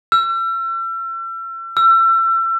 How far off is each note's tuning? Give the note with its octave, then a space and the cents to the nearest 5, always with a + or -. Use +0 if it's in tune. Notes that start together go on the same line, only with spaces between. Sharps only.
E6 +40
E6 +35